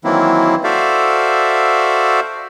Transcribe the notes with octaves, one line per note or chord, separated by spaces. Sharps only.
D#3 E3 F#3 A#3 C4 E4
F#4 A4 C5 D5 E5 F5